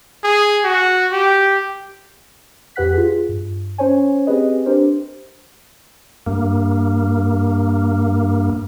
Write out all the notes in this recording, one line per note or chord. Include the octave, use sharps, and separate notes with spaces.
G#4
F#4
G4
F2 G4 B4 F#5 F#6 B6
F4 G#4
G2
C#4 C5 C#5 G#5
C4 G4 G#4 B4 D#5
D4 G4 A#4 C5
G2 A#3